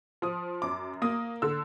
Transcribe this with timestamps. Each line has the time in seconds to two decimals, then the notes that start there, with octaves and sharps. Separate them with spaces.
0.22 F3 D#6
0.62 F#2 D6
1.02 A#3 D#6
1.42 D3 E6